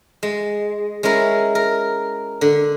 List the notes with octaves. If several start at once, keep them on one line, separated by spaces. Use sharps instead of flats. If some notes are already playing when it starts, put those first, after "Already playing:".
G#3
G#3 C#4 E4 A#4
A#4
D3